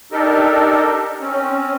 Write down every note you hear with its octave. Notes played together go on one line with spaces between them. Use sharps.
D4 D#4 G4 A4 A#4
C4 C#4